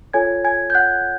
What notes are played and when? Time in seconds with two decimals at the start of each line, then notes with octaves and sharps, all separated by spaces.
0.13 F4 A4 C#5 G#5 G#6
0.44 G#5 G#6
0.70 G6
0.75 F#5 F#6